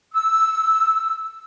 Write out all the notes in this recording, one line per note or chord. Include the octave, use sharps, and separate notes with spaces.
E6